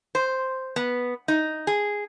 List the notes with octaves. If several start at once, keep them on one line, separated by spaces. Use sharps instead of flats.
C5
B3
D#4
G#4